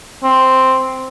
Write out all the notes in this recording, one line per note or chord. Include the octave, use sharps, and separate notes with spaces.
C4